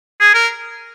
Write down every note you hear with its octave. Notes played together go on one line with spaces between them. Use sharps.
G#4
A#4